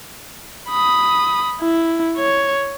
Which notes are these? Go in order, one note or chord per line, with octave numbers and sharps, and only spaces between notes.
B5 D#6
E4
C#5